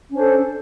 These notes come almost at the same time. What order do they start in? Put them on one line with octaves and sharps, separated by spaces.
C#4 D4 C5 A4